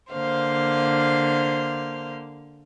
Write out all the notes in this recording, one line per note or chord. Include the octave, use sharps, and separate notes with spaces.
D3 A#3 C5 F5